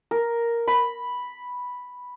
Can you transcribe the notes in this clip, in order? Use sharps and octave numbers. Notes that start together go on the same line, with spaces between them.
A#4
B5